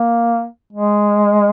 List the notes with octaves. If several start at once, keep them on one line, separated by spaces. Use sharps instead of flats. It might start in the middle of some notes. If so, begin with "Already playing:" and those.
Already playing: A#3
G#3